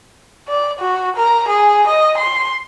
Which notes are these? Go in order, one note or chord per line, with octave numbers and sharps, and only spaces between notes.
D5
F#4
A#4
G#4
D#5
C6